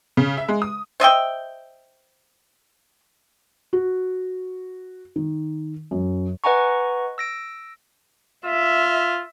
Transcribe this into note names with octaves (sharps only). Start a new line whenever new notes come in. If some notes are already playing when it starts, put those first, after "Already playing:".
C#3
E5
G#3
D#6
C5 D#5 E5 G5
F#4
D#3
F#2
B4 D#5 F#5 G#5 A#5 C#6
E6 A#6 D7
F4 E5